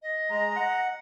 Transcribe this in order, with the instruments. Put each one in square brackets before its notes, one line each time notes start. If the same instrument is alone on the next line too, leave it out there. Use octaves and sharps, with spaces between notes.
[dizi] D#5
[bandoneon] G#3 [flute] A#5
[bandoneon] F#5